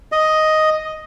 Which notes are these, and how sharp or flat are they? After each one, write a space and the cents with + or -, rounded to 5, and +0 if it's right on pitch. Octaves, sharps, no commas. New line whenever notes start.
D#5 +5